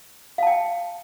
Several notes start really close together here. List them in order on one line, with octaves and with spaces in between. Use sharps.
F5 A5 G5